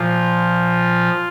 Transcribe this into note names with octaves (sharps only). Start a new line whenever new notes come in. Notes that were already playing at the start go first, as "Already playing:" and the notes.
Already playing: A#2 F3 F4